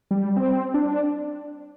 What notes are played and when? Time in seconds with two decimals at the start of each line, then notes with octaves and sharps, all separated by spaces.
0.11 G3
0.36 C4
0.74 D4